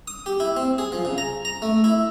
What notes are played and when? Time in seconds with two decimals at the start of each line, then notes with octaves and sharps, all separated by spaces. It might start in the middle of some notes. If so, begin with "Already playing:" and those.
0.08 D#6
0.26 G4
0.40 E4
0.57 C4
0.78 G#4
0.92 F3
1.05 C#3
1.18 A#5
1.45 A#5
1.62 A3
1.84 E4